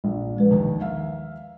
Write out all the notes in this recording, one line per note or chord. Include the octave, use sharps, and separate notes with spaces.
A#1
F3 G#3 B4
D#2 D#3
E5 F5